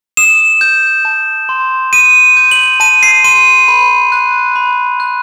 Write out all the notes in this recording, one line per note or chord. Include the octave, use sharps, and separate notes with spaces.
D#6 E7
G6
A5
C6
D#6 D#7
G6
F#7
A5 D#7
C7
C6 D#7
B5
F#6
B5
F#6